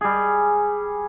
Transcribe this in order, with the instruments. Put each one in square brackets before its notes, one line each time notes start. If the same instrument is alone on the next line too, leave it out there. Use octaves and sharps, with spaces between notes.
[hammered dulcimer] G3 G#4